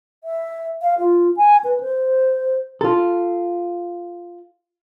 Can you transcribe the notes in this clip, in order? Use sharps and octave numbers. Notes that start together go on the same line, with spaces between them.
E5
F5
F4
G#5
B4
C5
F4 A4